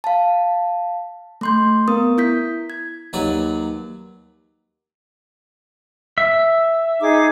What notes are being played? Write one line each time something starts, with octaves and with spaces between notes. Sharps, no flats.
F5 A5
A3 C6 G6
B3 A#4 D#6
E4 G6 B6
G#6
D#2 F#3 B4 D5
E5
D#4 G#4 D6